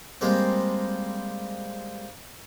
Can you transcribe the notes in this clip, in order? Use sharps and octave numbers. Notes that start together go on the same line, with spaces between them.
G3 G#3 A#3 C4